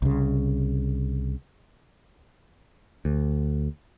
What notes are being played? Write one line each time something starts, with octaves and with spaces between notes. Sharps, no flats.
C2 C#3
D2